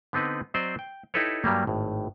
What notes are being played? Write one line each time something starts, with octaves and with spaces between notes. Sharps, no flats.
D3 B3 C4 D#4 B4
F#3 C4 C5 D5 D#5
G5
D#4 E4 G4 A4 B4 C#5
G2 F#3 G3 A#3
G#1 A2